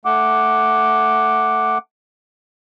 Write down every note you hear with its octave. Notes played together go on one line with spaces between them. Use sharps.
A3 F#5 D6